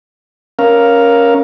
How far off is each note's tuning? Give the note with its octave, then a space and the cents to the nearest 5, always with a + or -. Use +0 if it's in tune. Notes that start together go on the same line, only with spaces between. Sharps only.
C#4 +0 A#4 +10 F5 +0